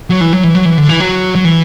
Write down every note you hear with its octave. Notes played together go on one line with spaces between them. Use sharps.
F#3
E3
F#3
E3
F#3
E3
D3
E3
F#3
F#3
E3